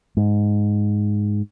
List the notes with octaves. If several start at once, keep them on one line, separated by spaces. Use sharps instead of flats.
G#2